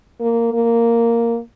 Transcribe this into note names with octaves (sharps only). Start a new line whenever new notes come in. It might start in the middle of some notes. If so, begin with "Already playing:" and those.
A#3
A#3